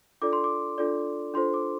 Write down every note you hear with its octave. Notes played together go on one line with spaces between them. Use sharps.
D4 F4 A4 D5 D6
C6
D6
D4 F4 A4 D5
D4 F4 A4 C5 C6
D6